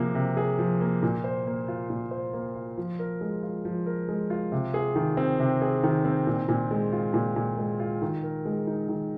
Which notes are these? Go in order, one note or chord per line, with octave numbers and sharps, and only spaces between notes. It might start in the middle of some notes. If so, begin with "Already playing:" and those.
Already playing: C3 F3 A#3 G#4
C3
G#4
F3
A#3
A#2
C5
A#3
F4
A#2
C5
A#3
F4
F3
A#4
G#3
F4
F3
A#4
G#3
F4
C3
G#4
D#3
C4
C3
G#4
D#3
C4
A#2
A#2
G#3
F4
A#2
A#2
G#3
F4
D#3
A#4
G#3
D#4
D#3